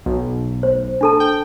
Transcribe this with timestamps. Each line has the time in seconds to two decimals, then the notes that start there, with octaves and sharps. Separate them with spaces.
0.06 B1
0.63 C5
1.01 D4 A4 A5
1.20 G5